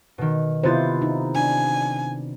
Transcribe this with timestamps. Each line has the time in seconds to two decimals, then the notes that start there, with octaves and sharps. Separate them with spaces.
0.18 B2 D#3
0.63 C3 B3 E4 F4 C5 A6
1.02 D#4
1.35 D4 G#5